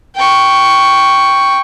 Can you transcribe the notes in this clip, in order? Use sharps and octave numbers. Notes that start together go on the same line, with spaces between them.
G5 C#6